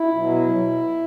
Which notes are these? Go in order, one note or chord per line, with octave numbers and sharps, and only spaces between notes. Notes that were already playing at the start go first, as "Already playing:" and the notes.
Already playing: E4
B2 F#3